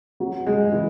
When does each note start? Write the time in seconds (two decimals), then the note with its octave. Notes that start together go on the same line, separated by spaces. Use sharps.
0.20 F#3
0.47 G#3
0.72 E3